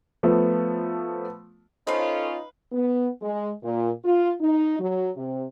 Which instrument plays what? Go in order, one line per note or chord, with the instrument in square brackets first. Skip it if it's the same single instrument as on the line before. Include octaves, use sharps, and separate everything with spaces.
[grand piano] F3 A3 B3
[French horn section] C#4 F4 [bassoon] D#4 [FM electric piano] A4 C5 D#5 [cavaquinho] B4 F5
[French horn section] B3
G#3
A#2
F4
D#4
F#3
C3